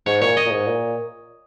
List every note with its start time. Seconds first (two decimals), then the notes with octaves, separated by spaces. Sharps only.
0.06 G#2 C#5
0.21 A#2 C#5
0.37 D#5
0.45 A#2
0.52 G#2
0.67 A#2